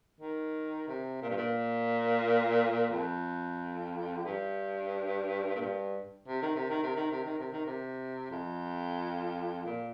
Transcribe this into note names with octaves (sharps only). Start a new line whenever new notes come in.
D#3
C3
A#2
G2
A#2
F2
G2
A#2
G2
C3
D#3
C3
D#3
C3
D#3
C3
D#3
C3
D#3
C3
F2
A#2